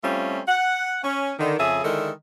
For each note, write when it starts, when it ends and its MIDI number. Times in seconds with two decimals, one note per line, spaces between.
0.04 0.40 55
0.04 0.40 57
0.04 0.40 60
0.04 0.40 61
0.04 0.40 65
0.47 0.99 78
1.03 1.33 61
1.39 1.54 50
1.39 1.54 51
1.59 1.79 41
1.59 1.79 49
1.59 1.79 68
1.59 1.79 76
1.84 2.10 50
1.84 2.10 51
1.84 2.10 56
1.84 2.10 64
1.84 2.10 69